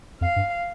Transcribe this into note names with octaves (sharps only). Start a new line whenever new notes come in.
F2 F5
G2